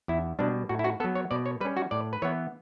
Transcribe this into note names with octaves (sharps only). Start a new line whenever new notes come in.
E2 E4
B2 G3 D4
A2 F#4
E4
F#4
F#3 B3 A4
C#5
B2 D5
C#5
G3 C#4 B4
F#4
A2 D5
B4
E3 B3 C#5